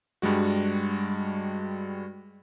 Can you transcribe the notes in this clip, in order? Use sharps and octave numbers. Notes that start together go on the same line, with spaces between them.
G2 G3 G#3 F#4